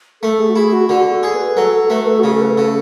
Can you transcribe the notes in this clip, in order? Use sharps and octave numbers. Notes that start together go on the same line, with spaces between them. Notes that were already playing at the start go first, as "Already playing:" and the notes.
A3 A4
G#4
F#4
E4 G#4
F#4
D3 F#4
A4
G#4
B4
F#3 A4
A4
A3 B4
B4
A4
F#4
C#3 G#4
A4
B4
G#4
C#3 A4